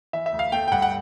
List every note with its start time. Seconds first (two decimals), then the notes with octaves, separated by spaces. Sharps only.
0.13 E3 E5
0.26 E5
0.33 D2
0.39 F5
0.52 A3 G5
0.68 G5
0.72 G2 F#5
0.82 F#5